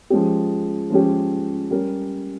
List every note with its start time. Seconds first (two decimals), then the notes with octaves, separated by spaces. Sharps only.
0.10 F3 G#3 C#4 G4
0.90 F3 G#3 C#4 G4
1.71 G3 C#4 G4 A#4